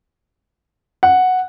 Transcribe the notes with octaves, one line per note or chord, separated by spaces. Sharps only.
F#5